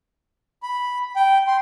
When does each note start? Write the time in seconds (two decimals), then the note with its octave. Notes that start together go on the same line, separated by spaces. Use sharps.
0.63 B5
1.16 G5
1.47 C6